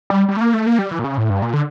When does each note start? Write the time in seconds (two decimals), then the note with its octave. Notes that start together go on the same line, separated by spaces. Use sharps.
0.10 G3
0.29 G3
0.36 A3
0.41 A#3
0.54 A3
0.66 A#3
0.79 G3
0.91 E3
0.99 A#2
1.04 C#3
1.18 A2
1.30 G2
1.42 A#2
1.54 D3